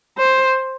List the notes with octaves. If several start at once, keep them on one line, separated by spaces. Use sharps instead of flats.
C5